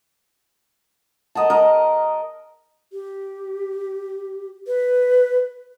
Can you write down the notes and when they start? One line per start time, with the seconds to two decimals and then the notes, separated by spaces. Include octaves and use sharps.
1.35 A#4 D#5 F#5 A5
1.50 A#4 D#5
2.92 G4
4.67 B4